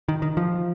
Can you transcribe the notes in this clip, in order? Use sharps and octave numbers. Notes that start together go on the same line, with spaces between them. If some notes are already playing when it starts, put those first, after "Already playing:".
D#3
D#3
F3